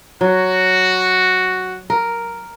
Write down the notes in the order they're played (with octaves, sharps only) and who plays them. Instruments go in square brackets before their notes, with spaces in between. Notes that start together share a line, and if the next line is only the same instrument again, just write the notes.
[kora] F#3 [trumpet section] F#4
[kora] A#4